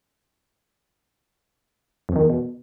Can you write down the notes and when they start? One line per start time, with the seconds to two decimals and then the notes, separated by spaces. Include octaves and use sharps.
2.09 F2
2.16 D#3
2.23 E2
2.30 B2